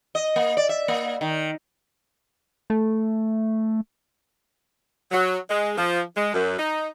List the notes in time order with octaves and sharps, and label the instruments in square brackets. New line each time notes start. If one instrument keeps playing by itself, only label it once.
[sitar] D#5
A#3
D5
E5
A#3
D#3
[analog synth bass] A3
[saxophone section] F#3
G#3
F3
G#3
F#2
D#4